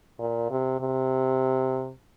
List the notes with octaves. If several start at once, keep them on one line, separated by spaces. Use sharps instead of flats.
A#2
C3
C3